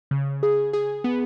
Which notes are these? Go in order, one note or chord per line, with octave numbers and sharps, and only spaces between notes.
C#3
G#4
G#4
B3